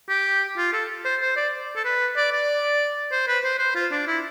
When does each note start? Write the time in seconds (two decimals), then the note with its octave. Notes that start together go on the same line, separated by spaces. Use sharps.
0.09 G4
0.57 F4
0.73 A4
1.05 C5
1.21 C5
1.37 D5
1.76 A4
1.85 B4
2.16 D5
2.32 D5
3.12 C5
3.28 B4
3.44 C5
3.59 C5
3.75 F4
3.91 D4
4.07 E4